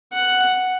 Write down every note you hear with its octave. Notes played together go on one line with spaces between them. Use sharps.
F#5